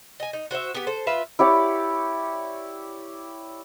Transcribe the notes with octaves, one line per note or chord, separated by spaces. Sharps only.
D#5 G#5
D#4
F#4 C5 D5 E5
B3 G4
A4 C5
F4 B4 E5
E4 G4 C#5 D5